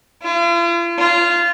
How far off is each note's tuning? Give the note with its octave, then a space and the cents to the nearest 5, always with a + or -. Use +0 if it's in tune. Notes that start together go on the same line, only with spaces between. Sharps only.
F4 -45
F4 -15